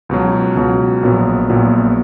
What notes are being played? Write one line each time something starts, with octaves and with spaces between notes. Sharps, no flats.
C#2 B2 F#3
C#2 B2 F#3
A#1 A#2 F#3 B3
A#1 A#2 F#3 B3